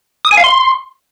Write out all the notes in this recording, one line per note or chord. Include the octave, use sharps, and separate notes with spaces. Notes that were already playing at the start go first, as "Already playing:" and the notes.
D#6
G#5
F5
C6